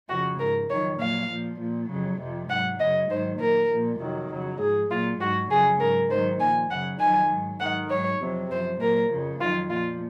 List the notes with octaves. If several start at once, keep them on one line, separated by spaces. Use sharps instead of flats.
F2 C#3 F3 F#4
G#2 F3 A#4
F2 D#3 F#3 C#5
A#2 F#3 F5
A#2 F3
A#2 F3
F2 C#3 F#3
F2 C3 F3
G#2 F#3 F#5
F#2 C#3 F#3 D#5
G#2 D#3 F#3 C5
A#2 F#3 A#4
A#2 F3
F2 C3 D#3 F#3
F2 C#3 F#3
G#2 G#4
F3
A#2 F#3 F4
G#2 F#3 F#4
F2 C#3 F#3 G#4
G#2 F#3 A#4
G#2 D#3 F#3 C5
A#2 F3 G#5
F#2 C#3 F#3 F#5
F2 D#3 F#3 G#5
G#2 F#3
G#2 D#3 F#3 F#5
G#2 F#3 C#5
F2 C3 F#3
F#2 F3 C5
A#2 F#3 A#4
F2 C#3 F3
F2 D#3 F#3 F4
A#2 F3 F4